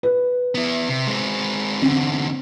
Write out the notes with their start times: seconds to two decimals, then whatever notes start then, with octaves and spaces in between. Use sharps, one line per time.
0.03 B4
0.55 B3 E4
0.89 C3
1.07 G#3 C4
1.82 E2 D3 C4